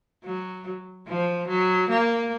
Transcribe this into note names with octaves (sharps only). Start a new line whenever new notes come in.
F#3
F3
F#3
A#3